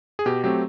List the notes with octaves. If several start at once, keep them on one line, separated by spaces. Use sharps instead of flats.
G#4
B2 G4
F#3 A3 C4 G4